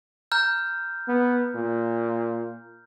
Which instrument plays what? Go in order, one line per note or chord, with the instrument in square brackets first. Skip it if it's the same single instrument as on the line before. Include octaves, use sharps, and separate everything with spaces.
[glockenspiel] A#5 F6 G6
[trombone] B3
A#2